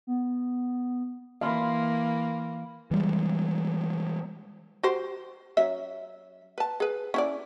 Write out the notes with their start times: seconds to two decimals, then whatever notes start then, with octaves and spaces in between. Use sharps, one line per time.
0.07 B3
1.41 E3 A#3 F5 B5 C6
2.91 E3 G3 G#3
4.83 F#4 G4 C5
5.57 F#3 C#4 E5
6.58 B4 A5
6.80 G#4 B4
7.14 C#4 E4 D5